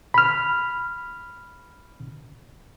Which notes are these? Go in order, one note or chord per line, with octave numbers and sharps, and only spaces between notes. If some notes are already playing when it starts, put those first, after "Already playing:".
B5 F6